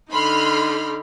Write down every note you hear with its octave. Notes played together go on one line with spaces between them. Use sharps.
D3 D#4 B5 C6 F6